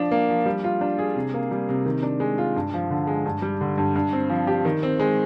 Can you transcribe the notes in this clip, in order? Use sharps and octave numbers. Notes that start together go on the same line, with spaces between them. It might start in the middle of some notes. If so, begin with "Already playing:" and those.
Already playing: F3 D4
A#3
F3
G3
F4
D4
G#4
C3
A#3
G3
C3
D#3
D4
G#3
F4
G2
F3
D3
G#3
G2
G3
D3
G2
G2
C4
F3
G4
D#3
C4
G#3